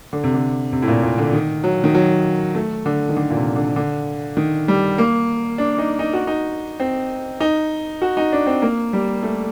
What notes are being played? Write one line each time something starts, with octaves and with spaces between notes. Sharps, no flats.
D3
C3
D3
C3
A2
A#2
A#2
D3
D#3
F#3
D#3
F#3
A3
D3
D#3
D3
A#2
C3
D3
D3
D#3
G3
A#3
D4
D#4
D#4
F#4
D#4
C4
D#4
F#4
D#4
D4
C4
A#3
G3
A3